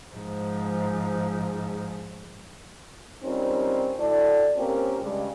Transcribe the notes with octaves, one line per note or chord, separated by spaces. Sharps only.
G#2 F3
G3 C4 C#4 D#4 F4 A#4
D2 A2 A4 D5
A#3 C4 C#4 F4 G4 A#4
G2 C#3 G3 G#3